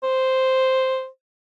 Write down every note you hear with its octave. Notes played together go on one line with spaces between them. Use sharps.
C5